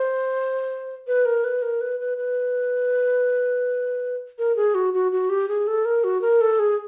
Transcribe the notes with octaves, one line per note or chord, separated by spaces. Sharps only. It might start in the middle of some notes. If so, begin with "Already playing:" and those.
Already playing: C5
B4
A#4
B4
A#4
B4
B4
B4
A#4
G#4
F#4
F#4
F#4
G4
G#4
A4
A#4
F#4
A#4
A4
G#4